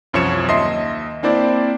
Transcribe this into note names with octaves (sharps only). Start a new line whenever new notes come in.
C2 F#2 F3 C#5 C#7 E7
D#2 D#5 E5 C6 C7
A#3 C4 D4 E4 C5 D5